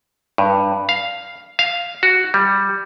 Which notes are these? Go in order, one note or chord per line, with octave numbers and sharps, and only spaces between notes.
G2
F5
F5
F#4
G3